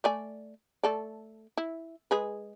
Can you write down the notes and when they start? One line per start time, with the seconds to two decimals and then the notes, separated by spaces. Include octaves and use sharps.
0.04 A3 D5 G#5
0.83 A3 A4 D5
1.57 E4
2.11 G#3 G#4 B4